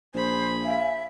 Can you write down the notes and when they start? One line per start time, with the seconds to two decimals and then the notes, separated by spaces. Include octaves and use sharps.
0.14 A#1 G#4 C5 B5
0.63 E5 F5 G#5